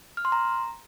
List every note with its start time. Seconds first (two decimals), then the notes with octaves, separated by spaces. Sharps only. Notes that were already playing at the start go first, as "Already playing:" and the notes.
0.17 F6
0.25 C6
0.32 A#5